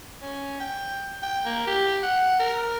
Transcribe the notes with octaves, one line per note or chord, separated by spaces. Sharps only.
C#4
G5
G5
A#3
G4
F#5
A#4